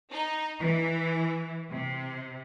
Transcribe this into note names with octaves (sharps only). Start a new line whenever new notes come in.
D#4
E3
C3